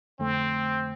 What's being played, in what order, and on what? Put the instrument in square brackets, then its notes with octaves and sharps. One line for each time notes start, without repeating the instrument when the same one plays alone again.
[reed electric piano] F2 D3 A3 [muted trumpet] C4